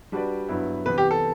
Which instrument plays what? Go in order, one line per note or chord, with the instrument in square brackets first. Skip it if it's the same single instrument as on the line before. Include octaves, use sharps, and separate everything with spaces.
[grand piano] G3 D4 F#4 B4 D5
G2 F#3 B3 E4 B4
[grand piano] C3 E3 B3 [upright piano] B4
[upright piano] G4
A4